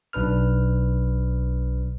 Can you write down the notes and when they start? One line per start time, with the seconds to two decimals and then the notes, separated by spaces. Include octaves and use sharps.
0.13 B1 D4 B4 F6